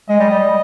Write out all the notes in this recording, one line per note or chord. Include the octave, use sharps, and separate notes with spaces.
G#3 D#5
G3
G3
G3